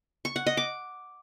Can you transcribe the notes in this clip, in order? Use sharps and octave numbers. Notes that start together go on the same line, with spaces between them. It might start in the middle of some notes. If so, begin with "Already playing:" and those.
C#6
F#5
D#5
D6